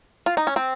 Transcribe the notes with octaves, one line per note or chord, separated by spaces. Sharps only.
F4
D#4
C#4
C4